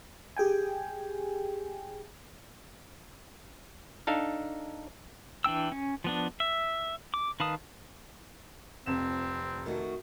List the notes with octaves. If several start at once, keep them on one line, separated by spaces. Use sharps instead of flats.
G4 G#4 G5 G#5
D4 D#4 A4 F5
E3 D4 G5 E6
C#4
F3 B3 D4
E5
D6
D#3 B4 F5 A5 D#6
F1 F2 C4 E7
D#3 A3 F#4